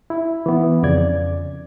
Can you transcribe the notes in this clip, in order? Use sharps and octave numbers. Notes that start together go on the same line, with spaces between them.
E4
E3 B3
F2 C#3 D5 G#6